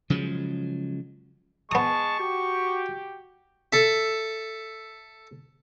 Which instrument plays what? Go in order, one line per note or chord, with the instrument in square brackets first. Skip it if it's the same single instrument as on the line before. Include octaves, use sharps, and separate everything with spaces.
[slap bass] C#3 F3 F#3 G#3
[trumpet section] G#3 A5 [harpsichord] B3 D#6 [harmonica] C#6
[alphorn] F#4 [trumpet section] G4
[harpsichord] A4 E5